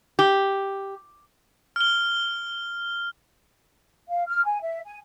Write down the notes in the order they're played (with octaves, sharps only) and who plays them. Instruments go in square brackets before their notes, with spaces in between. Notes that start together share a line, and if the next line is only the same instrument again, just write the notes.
[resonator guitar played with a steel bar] G4
[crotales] F6 G7
[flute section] F5
F6
G#5
E5
G#5